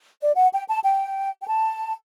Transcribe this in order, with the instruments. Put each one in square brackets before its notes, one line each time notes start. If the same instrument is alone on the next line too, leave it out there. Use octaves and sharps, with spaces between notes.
[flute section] D5
F#5
G5
A5
G5
G5
A5